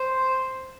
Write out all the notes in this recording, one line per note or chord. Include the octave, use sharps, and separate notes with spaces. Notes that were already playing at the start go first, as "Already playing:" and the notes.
Already playing: C5